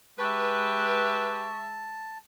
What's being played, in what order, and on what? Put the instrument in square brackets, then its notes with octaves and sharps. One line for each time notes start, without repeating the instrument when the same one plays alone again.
[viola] G#3 E5 [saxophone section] G4 B4 [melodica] A5 [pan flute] C#6